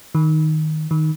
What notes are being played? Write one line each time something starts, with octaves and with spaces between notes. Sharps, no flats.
D#3
D#3